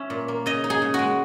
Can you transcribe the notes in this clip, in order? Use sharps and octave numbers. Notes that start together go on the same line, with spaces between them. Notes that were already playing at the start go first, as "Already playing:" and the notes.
Already playing: C#4 E5
A#2
A#3
C#3 D#5
D#4
G#4
C#3
G#3 F#4